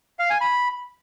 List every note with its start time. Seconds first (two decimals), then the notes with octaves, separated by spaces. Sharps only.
0.19 F5
0.30 G#5
0.41 B5